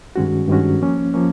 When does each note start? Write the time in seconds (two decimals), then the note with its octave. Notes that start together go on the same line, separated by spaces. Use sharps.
0.16 G2 D#3 G#3 C#4 F#4
0.48 G2 D#3 G#3 C#4 F#4
0.81 F3 A#3 C#4
1.14 F3 A#3 C#4